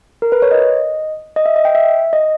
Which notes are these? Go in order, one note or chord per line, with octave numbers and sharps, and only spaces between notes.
A#4
B4
C#5
D#5
D#5
E5
D#5
G5
E5
D#5